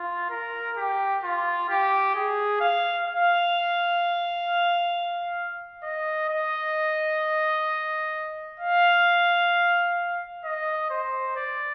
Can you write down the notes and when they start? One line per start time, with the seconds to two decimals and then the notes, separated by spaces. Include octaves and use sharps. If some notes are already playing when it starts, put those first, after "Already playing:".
Already playing: F4
0.30 A#4
0.77 G4
1.24 F4
1.69 G4
2.15 G#4
2.61 F5
3.07 F5
5.84 D#5
6.30 D#5
8.60 F5
10.44 D#5
10.90 C5
11.36 D5